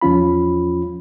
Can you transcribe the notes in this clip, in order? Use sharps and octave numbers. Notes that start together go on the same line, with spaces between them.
E2 F3 C#4 F4 B5